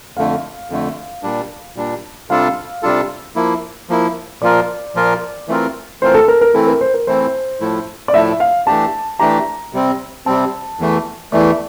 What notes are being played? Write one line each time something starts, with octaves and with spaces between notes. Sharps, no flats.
F2 D3 A3 F5
F2 D3 A3
A#2 G3 D4
A#2 G3 D4
C3 G3 D4 F4 A4 F5
C3 G3 D4 F4 A4
F3 A#3 E4
F3 A#3 E4
A#2 F3 A#3 F4 A#4 D5
A#2 F3 A#3 F4 A#4
E3 A3 C4 F4 A#4
E3 A3 C4 F4 A#4 C5
A4
A#4
A#4
E3 A3 C4 E4 A4
A#4
C5
A#4
E3 A3 C4 E4 C5
A2 F3 A3 E4
D5
A2 F3 A3 E4 E5
F5
E3 A3 D4 G4 A5
E3 A3 D4 G4 A#5
C3 G3 C4
C3 G3 C4 A5
E2 E3 A3
E2 E3 A3 D5